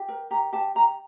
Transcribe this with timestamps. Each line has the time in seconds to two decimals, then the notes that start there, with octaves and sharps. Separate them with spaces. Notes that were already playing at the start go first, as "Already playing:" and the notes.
Already playing: G4
0.08 A#4
0.31 G4 A#5
0.53 G4 A5
0.75 G4 A#5